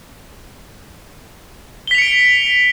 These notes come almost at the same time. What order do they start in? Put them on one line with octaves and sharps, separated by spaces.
G7 B6 F7 C#7 D7